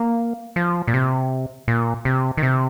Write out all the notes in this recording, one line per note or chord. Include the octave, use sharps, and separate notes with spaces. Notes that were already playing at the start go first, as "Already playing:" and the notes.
Already playing: A#3
F3
A#2
C3
A#2
C3
D#3
C3